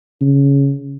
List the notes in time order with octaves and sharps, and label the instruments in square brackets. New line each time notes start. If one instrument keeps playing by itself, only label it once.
[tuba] C#3